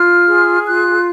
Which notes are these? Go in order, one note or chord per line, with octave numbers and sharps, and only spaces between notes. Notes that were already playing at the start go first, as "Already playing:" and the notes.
Already playing: F4 F6
G#4
F4 F#6